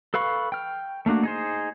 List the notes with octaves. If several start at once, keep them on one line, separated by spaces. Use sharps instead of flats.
A4 B4 F5 B5 C#6
G5 F6
A3 A#3 D4 F#4
D#4 G#4 C5